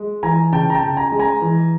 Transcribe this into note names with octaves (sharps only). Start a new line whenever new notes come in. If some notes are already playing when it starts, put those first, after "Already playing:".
Already playing: G#3
E3 G#5 A#5
C#3 G5 A5
A#5
G5 A5
C#3
G#5 A#5
G#3
G#5 A#5
E3